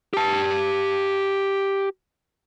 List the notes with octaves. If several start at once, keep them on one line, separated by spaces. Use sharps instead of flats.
G4 A5